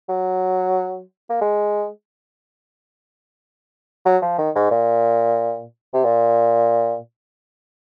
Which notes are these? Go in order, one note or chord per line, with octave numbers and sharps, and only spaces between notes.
F#3
A#3
G#3
F#3
F3
D#3
G#2
A#2
C3
A#2